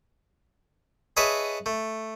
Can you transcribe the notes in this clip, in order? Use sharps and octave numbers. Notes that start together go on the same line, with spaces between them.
G#4 B4 C#5 D#5 E5 A5
A3